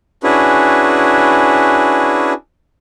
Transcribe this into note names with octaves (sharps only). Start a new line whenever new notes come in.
C#4 D4 E4 F#4 G#4 B4